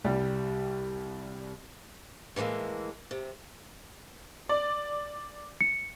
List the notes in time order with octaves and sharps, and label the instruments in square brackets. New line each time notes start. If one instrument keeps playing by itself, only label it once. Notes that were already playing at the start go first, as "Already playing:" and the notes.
[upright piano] C2 G3 G4
[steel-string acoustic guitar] A2 E3 F3 G#3 A#3
C3
[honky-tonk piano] D5
[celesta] C#7